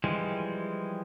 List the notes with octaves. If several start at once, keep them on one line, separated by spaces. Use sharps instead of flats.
E3 F3 G3 G#3